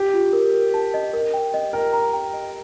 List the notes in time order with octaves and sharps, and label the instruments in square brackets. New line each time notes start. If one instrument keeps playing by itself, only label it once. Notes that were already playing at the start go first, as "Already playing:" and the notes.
Already playing: [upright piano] G4
[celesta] F4
A#4
A#4
A5
D#5
A#4
G5
D#5
[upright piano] A#4 [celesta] G5
[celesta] A#5
G5
D#5